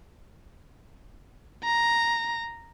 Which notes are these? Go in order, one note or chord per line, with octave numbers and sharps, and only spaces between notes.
A#5